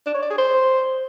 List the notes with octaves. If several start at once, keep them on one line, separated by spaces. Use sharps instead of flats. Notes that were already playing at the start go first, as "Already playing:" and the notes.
D4
C#5
D5
G#4
C5